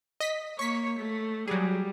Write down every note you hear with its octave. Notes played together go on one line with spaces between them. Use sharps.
D#5 B6
A#3 C#5 C#6 B6
A3
F#3 G3 G#4